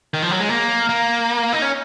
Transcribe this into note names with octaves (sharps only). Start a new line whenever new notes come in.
D#3
F3
F#3
G#3
A#3
A#3
D#4
C#4